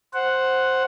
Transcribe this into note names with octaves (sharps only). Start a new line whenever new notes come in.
C5 F#5